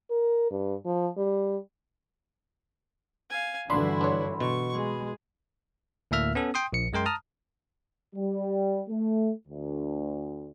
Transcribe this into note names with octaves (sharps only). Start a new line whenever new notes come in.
A#4
G2
F3
G3
F5 G#5
G2 D3 E3 D4 E4 F#4 B5 C6
D4 C#5
B2 C#6
G#3 G#4
D2 A2 A#3 E5 F6
B3 C#4 A4
G5 C6 D#6
A#1 C#7
F#2 G#3 A#4 G5 C6
A5 A#5 D#6 F6
G3
A3
D2